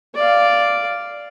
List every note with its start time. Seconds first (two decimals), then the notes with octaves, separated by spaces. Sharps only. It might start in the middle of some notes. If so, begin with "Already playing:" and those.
0.15 D5 F5